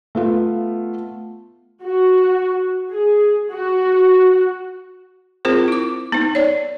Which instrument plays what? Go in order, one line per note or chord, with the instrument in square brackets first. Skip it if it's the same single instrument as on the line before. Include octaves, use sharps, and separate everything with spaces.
[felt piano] A3 B3 F4
[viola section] F#4
G#4
F#4
[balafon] C4 F4 G#4 A#4 C5
E4 D6
B3 D#4
C#5 D5